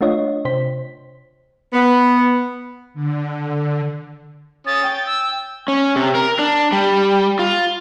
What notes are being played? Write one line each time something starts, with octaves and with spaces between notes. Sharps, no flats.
A3 D4 F4 C#5 D#5
C3 C5 B6
B3
D3
C#4 D#6 A6
G5
E6
C#4
C3
A#4
D4
G3
F4